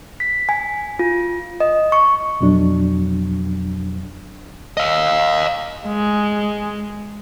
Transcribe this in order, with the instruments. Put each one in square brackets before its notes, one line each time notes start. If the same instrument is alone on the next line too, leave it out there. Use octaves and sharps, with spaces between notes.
[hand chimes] B6
G#5
F4
D#5
C#6
[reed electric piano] F2 B2 F#3 D4
[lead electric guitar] D#5 F5
[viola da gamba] G#3